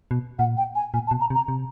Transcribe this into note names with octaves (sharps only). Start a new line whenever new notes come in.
B2
A#2 F#5
G5
G#5
A#2 G#5
A5
B2
A#5
C3
A#5
C3